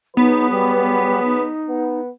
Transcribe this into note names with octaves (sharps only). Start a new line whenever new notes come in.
F#3 B3 D#4 G#4 B4
G3
D#4
B3